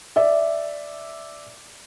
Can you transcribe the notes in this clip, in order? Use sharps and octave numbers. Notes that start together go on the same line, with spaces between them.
D5 E5